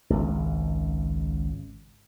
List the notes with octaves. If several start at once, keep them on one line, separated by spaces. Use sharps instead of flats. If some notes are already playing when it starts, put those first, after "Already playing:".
G#1 C#2